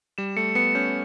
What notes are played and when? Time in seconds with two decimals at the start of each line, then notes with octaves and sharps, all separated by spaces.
0.18 G3 E7
0.37 A3 C#7
0.55 B3 C#7
0.75 C#4 G6